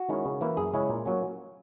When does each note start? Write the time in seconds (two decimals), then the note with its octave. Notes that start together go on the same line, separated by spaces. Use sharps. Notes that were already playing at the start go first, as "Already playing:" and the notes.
Already playing: F#4
0.09 D#3 G#3 C#4 E4
0.25 C#3
0.41 E3 A#3 E4
0.57 F#2 G#4
0.74 C#3 G#3 C#4 E4
0.90 A#2
1.06 F#3 A#3 C#4